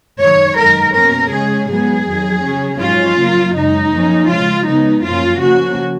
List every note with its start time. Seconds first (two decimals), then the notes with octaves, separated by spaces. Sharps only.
0.20 F#2 D#3 G#3 C#5
0.58 F#2 D#3 G#3 A#4
0.94 B2 A#3 C#4 A#4
1.31 C#3 G#3 C#4 G#4
1.69 G#2 F#3 B3 G#4
2.06 F2 D#3 F#3
2.43 C#3 F#3 C#4
2.80 G#2 F#3 C#4 F4
3.17 C#3 F#3 A#3
3.55 F#2 C#3 G#3 D#4
3.91 F#2 F3 A#3 C#4
4.28 C#3 F3 G#3 F4
4.65 C#3 G#3 B3 D#4
5.03 F#2 F3 A#3 C#4 F4
5.40 C#3 F3 A#3 C#4 F#4